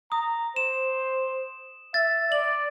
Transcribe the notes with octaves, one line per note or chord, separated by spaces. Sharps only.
A#5 D#6
C5 E7
E5 A6
D5 F#7